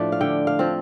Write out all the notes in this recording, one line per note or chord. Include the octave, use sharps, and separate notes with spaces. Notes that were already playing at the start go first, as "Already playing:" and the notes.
Already playing: A2 F3 A3 D4
F5
D3 G5
F5
F3 C4